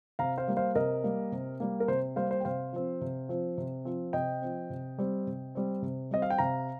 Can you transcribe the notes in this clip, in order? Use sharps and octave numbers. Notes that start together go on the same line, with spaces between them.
C3 F5 A#5
C5 F5
G3 A#3
C5 F5
C3 A#4 D#5
G3 A#3
C3
G3 A#3
A#4
C3 C5
G3 A#3 C5 F5
C5
G5
C3 C5 F5
F3 C4
C3
F3 C4
C3
F3 C4
C3 D#5 G5
F3 C4
C3
G3 C4
C3
G3 C4
C3
G3 C4 D#5
F5
G5
C3 F5 A#5